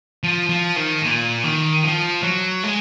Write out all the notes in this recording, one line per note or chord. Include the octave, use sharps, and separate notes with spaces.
F3
F3
D#3
A#2
D#3
F3
F#3
G#3